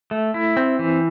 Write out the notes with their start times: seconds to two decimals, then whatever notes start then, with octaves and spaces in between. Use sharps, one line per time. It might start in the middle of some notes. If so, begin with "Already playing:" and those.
0.11 A3
0.34 E4
0.57 C4
0.79 E3